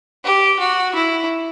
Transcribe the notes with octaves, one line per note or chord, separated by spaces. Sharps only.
G4
F#4
E4